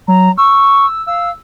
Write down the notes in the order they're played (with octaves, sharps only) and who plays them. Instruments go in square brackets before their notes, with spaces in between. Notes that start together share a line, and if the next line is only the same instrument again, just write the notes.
[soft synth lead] F#3 [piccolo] A#5
[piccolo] C#6 [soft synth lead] E6
[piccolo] F5 [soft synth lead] E6